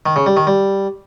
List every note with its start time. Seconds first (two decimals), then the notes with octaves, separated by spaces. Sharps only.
0.06 D#3
0.16 C#3
0.26 G3
0.37 D#3
0.47 G3